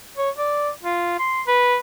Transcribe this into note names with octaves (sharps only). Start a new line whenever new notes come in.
C#5
D5
F4
C6
B4